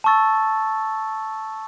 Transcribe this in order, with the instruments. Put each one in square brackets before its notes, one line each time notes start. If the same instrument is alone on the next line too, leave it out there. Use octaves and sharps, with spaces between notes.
[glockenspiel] A5 C#6 E6 A6